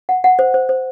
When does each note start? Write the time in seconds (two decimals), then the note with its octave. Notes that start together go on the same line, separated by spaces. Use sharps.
0.09 F#5
0.24 F#5
0.39 C5
0.54 C5
0.69 C5